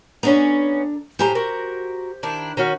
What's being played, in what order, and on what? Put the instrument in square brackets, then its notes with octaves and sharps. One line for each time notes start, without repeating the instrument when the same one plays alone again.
[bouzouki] B3 C#4 [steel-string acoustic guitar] D4 A4 A#5
[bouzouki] A2 G#5 A#5 [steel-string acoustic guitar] G4 C5
[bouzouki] F#4 A#4
D#3 D4 E4
D#3 C#4 F#4